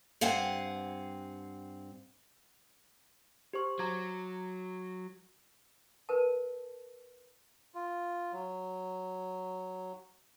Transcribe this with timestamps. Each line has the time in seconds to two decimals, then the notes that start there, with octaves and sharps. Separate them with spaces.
0.21 G2 C4 F5 F#5 G#5
3.53 G4 C5 C#6
3.79 F#3 A#5 D6 G#6
6.09 A#4 B4 A5
7.75 F4
8.33 F#3